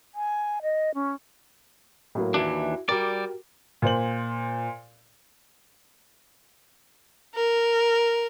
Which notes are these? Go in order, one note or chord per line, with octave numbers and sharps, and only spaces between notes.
G#5
D#5
C#4
A2 F#3 A#3
D#2 E3 D4 E4 F#4
G3 F#4 G4 A#4 D5
A#2 C5 F#7
A#4